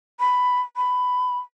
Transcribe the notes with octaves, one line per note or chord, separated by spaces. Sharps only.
B5
B5